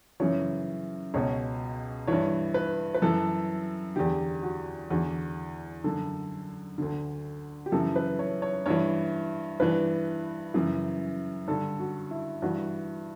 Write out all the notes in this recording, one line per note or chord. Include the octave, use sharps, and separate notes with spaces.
F#2 C#3 E3 C#5
C#2 B2 C#5
G2 E3 C#5
B4
B4
F#2 E3 A4
E2 D3 G4
F#4
E2 D3 F#4
F#2 D3 A4
D2 D3
G4
F#2 C#3 E3 A4
B4
C#5
C#5
G2 E3 C#5
G2 E3 B4
F#2 C#3 E3
G2 D3 A4
F#4
E4
G2 E3 F#4